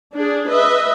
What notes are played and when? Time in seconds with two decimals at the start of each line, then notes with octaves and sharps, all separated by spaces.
0.15 D4 G#4
0.48 B4 D#5 E5